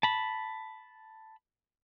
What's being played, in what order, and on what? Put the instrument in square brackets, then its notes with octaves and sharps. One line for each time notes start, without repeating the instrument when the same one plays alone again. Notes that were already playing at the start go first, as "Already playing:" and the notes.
[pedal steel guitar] A5 B5